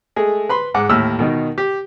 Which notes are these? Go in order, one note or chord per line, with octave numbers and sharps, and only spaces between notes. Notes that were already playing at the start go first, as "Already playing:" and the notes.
G#3 A3 G#4
B4 B5 C6
G#2 F#5 D6
D#2 A2 E6 F6
B2 D#3 D#4
G4